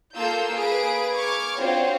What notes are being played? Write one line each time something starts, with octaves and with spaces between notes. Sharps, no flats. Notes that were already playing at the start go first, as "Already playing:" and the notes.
A#3 F4 A4 F5 E6 G6
A#3 G#4 B4 D7
C#6 D6 F6 G#6
C4 D4 F4 F#4 C5 C#5